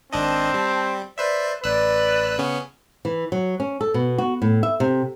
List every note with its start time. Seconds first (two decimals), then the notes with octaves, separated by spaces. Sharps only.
0.13 G#1 C4 D4 D#5 A5
0.54 G3
1.18 B4 C5 D5 E5
1.64 A1 B4 D5 E6 F#6
2.38 C#3 B3 C#4
3.05 E3
3.32 F#3
3.60 C#4
3.81 A4
3.94 B2
4.18 F#4
4.42 A2
4.63 E5
4.80 C3